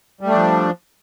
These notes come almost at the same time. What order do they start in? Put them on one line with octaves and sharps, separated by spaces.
G3 A3 D4 F3